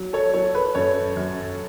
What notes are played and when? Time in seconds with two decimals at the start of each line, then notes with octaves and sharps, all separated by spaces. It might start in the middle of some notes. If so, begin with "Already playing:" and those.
Already playing: F#3
0.13 A4 C#5
0.34 F#3 A4 C#5
0.55 B4
0.75 F#2 A4 C#5
1.17 F#2